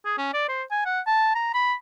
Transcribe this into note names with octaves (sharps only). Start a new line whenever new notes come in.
G#4
C#4
D5
C5
G#5
F#5
A5
A#5
B5